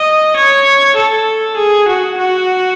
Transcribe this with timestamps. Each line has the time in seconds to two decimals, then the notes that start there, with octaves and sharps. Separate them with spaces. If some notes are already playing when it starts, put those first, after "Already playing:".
Already playing: D#5
0.36 C#5
0.96 A4
1.57 G#4
1.88 F#4
2.18 F#4